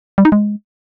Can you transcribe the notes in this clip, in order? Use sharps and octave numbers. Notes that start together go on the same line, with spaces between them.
G3
D#4
G#3